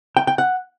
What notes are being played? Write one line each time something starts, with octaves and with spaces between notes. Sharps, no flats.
G5
G5
F#5